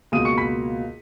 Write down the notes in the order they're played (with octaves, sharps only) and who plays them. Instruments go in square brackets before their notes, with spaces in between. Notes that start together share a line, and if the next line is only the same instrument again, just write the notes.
[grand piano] C#2 B2 A#3 D#6 D#7
C#6 C#7
B5 B6